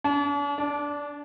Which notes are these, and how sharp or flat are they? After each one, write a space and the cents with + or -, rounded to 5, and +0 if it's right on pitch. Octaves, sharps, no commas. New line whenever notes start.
D4 -45
D4 -15